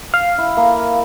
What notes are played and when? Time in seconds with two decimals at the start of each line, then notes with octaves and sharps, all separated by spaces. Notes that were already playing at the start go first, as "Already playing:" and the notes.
0.14 F5
0.38 E4
0.57 A#3